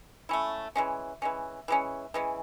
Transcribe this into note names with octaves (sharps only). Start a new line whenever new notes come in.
A3 C#4 E4
E3 G#3 C#4
E3 G#3 C#4
E3 G#3 C#4
E3 G#3 C#4